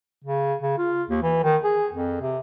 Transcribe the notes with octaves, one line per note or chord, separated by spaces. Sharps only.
C#3
C#3
F4
D#2
E3
D#3
G#4
F2
C3